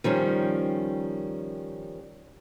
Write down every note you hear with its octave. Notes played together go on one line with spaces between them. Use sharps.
D#3 F3 G3 C#4